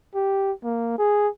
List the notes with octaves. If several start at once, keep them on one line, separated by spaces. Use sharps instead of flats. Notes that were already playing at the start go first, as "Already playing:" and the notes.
G4
A#3
G#4